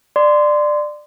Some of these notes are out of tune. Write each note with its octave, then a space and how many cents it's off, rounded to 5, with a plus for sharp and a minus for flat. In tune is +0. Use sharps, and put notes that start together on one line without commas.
D5 +20 C6 -20